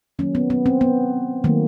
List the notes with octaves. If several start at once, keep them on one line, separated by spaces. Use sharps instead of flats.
D#3 F#3 A#3 C#4
B3
B3
C4
B3
D#3 F#3 A3 A#3